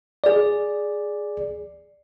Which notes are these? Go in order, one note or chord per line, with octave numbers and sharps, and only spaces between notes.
G#4 D5